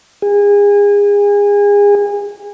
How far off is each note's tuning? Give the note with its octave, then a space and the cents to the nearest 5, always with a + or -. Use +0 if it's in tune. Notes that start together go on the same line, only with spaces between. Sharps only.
G#4 -30